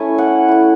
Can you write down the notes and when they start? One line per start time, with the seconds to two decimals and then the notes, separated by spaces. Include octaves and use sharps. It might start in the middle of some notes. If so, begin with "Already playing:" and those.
Already playing: A3 C#4 E4 G#5
0.18 F#5
0.49 A3 E4